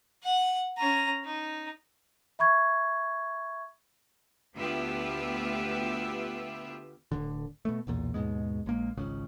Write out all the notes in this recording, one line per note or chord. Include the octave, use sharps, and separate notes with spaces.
F#5
C#4 A#5
D#4
E5 B5 C#6 G#6
D2 B3 F4 G4 B4 E5
D1 D3
B2 A3
B1 E2 A#2
D#2 G#2 B2 G#3
A#1 G#3 A#3
G#1 C#2 C#3